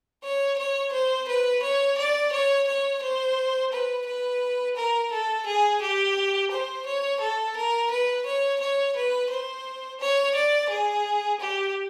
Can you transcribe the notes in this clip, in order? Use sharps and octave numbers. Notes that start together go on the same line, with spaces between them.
C#5
C#5
C5
B4
C#5
D5
C#5
C#5
C5
B4
B4
A#4
A4
G#4
G4
C5
C#5
A4
A#4
B4
C#5
C#5
B4
C5
C#5
D5
G#4
G4